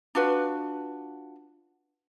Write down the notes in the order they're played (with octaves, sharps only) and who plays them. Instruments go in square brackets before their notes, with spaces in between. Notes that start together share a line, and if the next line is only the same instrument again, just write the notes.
[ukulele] D4 F4 F#4 B4